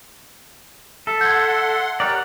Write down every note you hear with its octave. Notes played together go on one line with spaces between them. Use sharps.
A4 E5
F#5 C6 G6 G#6
G4 A#4 C#5 D5 F#5 G5